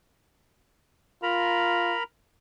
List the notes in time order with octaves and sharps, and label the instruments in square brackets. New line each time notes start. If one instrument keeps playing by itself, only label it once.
[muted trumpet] F4 [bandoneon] A#4 A#5 B5